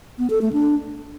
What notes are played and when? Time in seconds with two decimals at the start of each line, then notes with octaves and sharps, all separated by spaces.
0.19 B3
0.30 A4
0.41 A3
0.53 D4